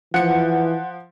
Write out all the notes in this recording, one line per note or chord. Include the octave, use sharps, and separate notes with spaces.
E3 F3 F#5 C#7